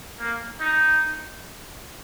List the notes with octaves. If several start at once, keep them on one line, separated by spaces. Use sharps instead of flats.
A#3
D#4